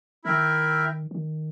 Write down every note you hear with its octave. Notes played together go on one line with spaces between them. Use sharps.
D#3 E4 A#4 E5 G5
D#3